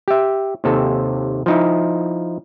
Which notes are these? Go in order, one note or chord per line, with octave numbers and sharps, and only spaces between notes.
G4 E5
D#2 C3 A4
F3 D#4 E4